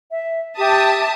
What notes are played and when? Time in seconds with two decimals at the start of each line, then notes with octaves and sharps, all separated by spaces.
0.11 E5
0.58 G4 E5 A5 D#6